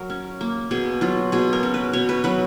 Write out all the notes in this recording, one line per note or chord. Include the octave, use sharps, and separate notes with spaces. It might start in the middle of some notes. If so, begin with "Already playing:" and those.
Already playing: F#3 A#4
C#4
A#3
B2 G#4
F#3 F4
B2 G#4
A#4
C#4
B4
B2 C#5
B4
F#3 B4